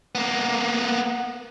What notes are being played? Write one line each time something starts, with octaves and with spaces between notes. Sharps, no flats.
A#3 B3